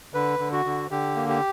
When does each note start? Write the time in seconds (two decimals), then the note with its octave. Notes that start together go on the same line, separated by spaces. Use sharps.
0.14 D3 B4
0.39 D3
0.52 F#4
0.65 D3
0.91 D3 G4
1.16 A#3
1.29 G4